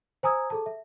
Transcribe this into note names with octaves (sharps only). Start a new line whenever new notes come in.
C5 G#5 A#5 D#6 E6 G#6
G#4 A4 A5
E5